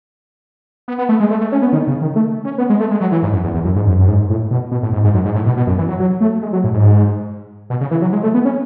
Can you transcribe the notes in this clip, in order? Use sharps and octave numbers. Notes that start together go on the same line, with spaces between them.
B3
B3
A3
G#3
A3
A3
C#4
B3
D#3
C#3
D#3
A3
C#4
B3
G#3
A3
G#3
F#3
E3
G#2
F#2
E2
E2
F#2
G#2
F#2
F#2
G#2
A2
B2
B2
A2
G#2
G#2
F#2
G#2
A2
B2
B2
F#2
E3
F#3
F#3
A3
G#3
F#3
A2
G#2
B2
C#3
E3
F#3
G#3
A3
B3
C#4